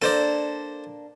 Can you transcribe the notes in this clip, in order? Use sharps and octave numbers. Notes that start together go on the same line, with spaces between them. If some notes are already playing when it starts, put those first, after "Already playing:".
A#3 D4 A4 C5 D5